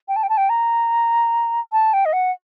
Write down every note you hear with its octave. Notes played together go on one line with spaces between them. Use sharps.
G5
A5
G5
A5
G5
A#5
A5
G5
D#5
F#5